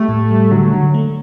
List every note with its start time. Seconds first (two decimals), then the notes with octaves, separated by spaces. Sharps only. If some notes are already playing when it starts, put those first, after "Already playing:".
Already playing: G3 A3 G4
0.09 A2
0.31 G3
0.51 D3 F#3
0.73 D3
0.94 A3